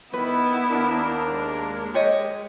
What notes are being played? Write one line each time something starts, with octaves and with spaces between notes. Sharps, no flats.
D#3 B3 E4 B4
D#2 D4 A#4
G#3
G4 C#5 D#5